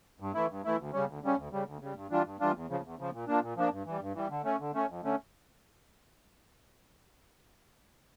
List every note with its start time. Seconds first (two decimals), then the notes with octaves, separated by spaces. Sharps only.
0.20 G2
0.34 E3 A3 E4
0.50 G2
0.65 E3 A3 E4
0.79 D2
0.93 C#3 G3 C#4
1.08 D2
1.23 C#3 G3 C#4
1.37 D2
1.52 C#3 G3
1.66 D2
1.81 C#3 G3
1.95 G2
2.11 E3 G3 D4 F4
2.25 G2
2.40 E3 G3 D4 F4
2.55 E2
2.69 C#3 F3
2.84 E2
2.98 C#3 F3
3.13 A#2
3.28 F3 A#3 D4
3.42 A#2
3.57 F3 A#3 D4
3.71 G2
3.86 E3 G3
4.01 G2
4.15 E3 G3
4.30 D3
4.44 A3 C#4
4.60 D3
4.74 A3 C#4
4.89 F2
5.03 D3 A3 C#4